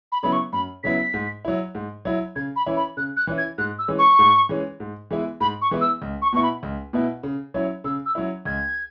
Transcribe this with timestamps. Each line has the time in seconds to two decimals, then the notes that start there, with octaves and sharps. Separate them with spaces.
0.12 B5
0.23 C#3 F#3 B3 E4 B5
0.32 C#6
0.53 F#2 B5
0.83 C#3 F#3 B3 E4 B6
1.14 G#2
1.45 F#3 E4
1.75 G#2
2.05 F#3 E4
2.36 C#3 G#6
2.56 B5
2.66 E3 C#4 E4
2.77 B5
2.97 C#3 F#6
3.17 F#6
3.27 E3 C#4 E4
3.38 G#6
3.58 G#2 F#6
3.79 E6
3.88 E3 G#3 C#4
3.99 C#6
4.19 G#2
4.49 E3 G#3 C#4
4.80 G#2
5.11 E3 G#3 B3 E4
5.40 G#2 B5
5.61 C#6
5.71 E3 G#3 B3 E4
5.81 E6
6.02 C#2
6.22 C#6
6.33 B2 B3 E4 C#6
6.43 B5
6.63 C#2
6.93 B2 B3 E4
7.23 C#3
7.54 F#3 C#4 E4
7.84 C#3 E6
8.06 E6
8.15 F#3 C#4 E4
8.45 C#2 G#6